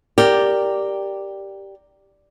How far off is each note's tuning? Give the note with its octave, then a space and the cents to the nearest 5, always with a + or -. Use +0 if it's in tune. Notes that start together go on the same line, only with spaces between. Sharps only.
G4 +0 A#4 -5 D5 +0